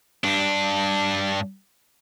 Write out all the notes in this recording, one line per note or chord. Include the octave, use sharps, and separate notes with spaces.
G2 D4